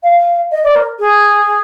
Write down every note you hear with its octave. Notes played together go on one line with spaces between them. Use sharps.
F5
D#5
D5
A#4
G#4